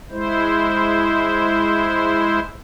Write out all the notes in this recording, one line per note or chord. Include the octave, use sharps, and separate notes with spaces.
G#3 E4 C5